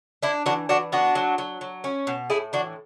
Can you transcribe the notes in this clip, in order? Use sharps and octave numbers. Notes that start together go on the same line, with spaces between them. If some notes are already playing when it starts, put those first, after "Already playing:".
D4 E4
E3 D4 F#4
E3 D4 F#4
B3 D4 F#4
F#3
F#3
F#3
C#4
B2
A2 E4 G#4
E3 D4 F#4